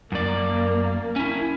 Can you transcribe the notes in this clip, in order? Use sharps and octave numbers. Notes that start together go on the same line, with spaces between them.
F#2 A#3 D5
C#4 E4